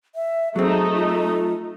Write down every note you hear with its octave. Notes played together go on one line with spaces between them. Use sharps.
E5
F#3 A3 C4 D#4 G#4
F4